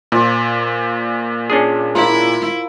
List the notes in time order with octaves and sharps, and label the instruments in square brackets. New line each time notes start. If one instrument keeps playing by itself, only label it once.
[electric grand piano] A#2 [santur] F4 C5 D5
[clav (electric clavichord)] C#4 D4 G#4
[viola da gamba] E4 [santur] F4 A#4 E6